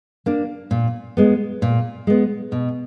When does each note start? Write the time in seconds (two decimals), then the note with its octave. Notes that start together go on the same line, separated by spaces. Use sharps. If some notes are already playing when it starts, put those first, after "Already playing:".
0.26 A#3 D4
0.71 A#2
1.17 G#3 B3
1.62 A#2
2.07 G#3 B3
2.52 B2